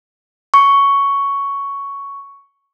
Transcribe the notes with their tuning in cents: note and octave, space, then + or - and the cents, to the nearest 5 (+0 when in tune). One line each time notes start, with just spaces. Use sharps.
C#6 +5